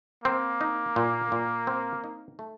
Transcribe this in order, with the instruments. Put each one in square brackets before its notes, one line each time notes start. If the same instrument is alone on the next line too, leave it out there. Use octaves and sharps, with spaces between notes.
[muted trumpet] A#3 [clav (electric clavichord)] C4
[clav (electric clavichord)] D#4
A#2
A#2
C4
D#4
A3